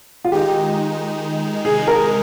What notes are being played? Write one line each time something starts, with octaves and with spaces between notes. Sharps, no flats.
F4
D#3 G#3 D#4 G4
C3 D#3 G#3 D#4 G#4
A#4